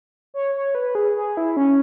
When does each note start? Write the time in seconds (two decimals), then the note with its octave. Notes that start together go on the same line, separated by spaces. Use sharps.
0.34 C#5
0.55 C#5
0.75 B4
0.95 G#4
1.16 G#4
1.37 E4
1.57 C#4